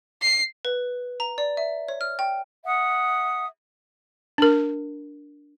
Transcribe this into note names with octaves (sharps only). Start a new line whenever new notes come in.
C7
B4
A#5
D5
E5
C#5
F6
G5
E5 F#5 D#6
D4 A#4